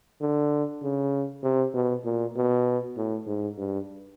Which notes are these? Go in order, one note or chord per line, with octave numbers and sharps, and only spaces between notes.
D3
C#3
C3
B2
A#2
B2
A2
G#2
G2